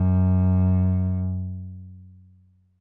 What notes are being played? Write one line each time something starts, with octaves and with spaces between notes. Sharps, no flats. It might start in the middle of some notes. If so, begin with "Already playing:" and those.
Already playing: F#2